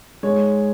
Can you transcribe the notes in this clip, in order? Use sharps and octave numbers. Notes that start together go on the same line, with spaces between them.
G#2 G#3 C#5